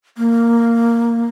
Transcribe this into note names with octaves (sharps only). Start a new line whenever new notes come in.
A#3